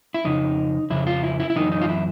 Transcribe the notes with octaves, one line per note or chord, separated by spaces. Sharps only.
E4
F2 C#3 D#4
F2 C#3 E4
F4
E4
E4
E4
F#2 C#3 E3 D#4
D#4
F4
E4